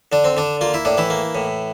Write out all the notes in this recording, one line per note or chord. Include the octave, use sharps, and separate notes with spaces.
D3 D4
C4
D3 D4
A#3 F4
E4
A2 D4
E3 E4
A#3
A2